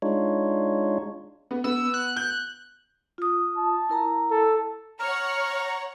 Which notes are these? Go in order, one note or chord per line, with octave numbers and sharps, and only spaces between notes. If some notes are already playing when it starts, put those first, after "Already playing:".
G#3 D4 D#4 F4 C#5
B3
B3 E6
F#6
F#6 G6
F4 D#6
A5
E4 A#4 A#5
A4
C#5 F#5 A#5 F6